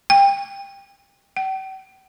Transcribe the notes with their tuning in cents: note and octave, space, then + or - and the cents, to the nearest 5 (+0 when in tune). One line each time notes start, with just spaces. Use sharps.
G5 +25
G5 -45